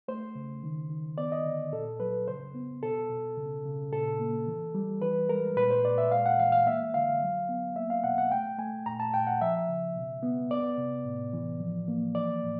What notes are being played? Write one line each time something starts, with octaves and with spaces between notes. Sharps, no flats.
A3 C5
C#3
D#3
D#3
B3 D5
D#5
D3
A#2 A4
F#3 B4
C#3 C5
B3
B2 A4
B2
C#3
C#3
A#2 A4
A#3
E3
G3
E3 B4
G#3 A#4
A#2 B4
C5
A#2 D5
E5
G#3 F5
F#5
E3 F5
F5
A#3 E5
D3 F5
F#3
B3
A#3 E5
F5
B2 F#5
F#5
A3 G5
A3 G#5
A#2 A#5
A5
A#2 G5
F#5
F3 E5
C#3
B2
B3
B3 D5
C3
A2
E3
F3
A#3
E3 D5
A2